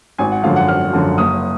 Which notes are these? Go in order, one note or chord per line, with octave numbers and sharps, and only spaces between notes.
G#1 G#5
F#5
F#2 D3 F3 F5
F#5
G#1 F6
F#2 D3 F3
F#1 D#6